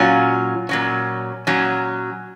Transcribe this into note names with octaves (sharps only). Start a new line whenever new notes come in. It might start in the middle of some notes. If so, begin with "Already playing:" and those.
Already playing: A#2 F#3 C#4 F4
A#2 F#3 C#4
A#2 F#3 C#4